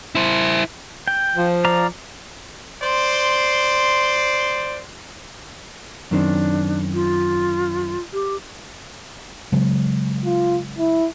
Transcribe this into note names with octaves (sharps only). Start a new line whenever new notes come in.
E4 C5
G5
F3
D5 F5 A#5
C5 D5 C6
F#2 D#3 C4 D4
F4
G4
C#3 F#3 G#3
F4
E4